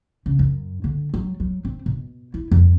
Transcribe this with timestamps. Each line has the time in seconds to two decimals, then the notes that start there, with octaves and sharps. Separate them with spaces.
0.26 C#3
0.39 F#2
0.84 D3
1.14 F#3
1.40 F#3
1.65 C4
1.86 B2
2.34 E4
2.51 F2